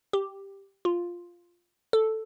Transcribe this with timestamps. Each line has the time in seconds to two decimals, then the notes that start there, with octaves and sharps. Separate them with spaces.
0.13 G4
0.85 F4
1.93 A4